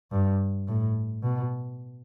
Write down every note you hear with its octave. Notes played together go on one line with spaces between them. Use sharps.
G2
A2
B2